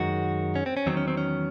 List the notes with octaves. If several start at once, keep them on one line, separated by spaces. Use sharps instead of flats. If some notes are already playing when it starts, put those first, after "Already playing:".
Already playing: F#2 D#3 G#3 F#4
C#4
C4
C#4
E2 D#3 F#3 C4
C#4
C4
C#4